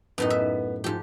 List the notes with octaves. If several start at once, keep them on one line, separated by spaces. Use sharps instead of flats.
F#2 A2 B3 D#4 B4
E5
G#2 F3 G4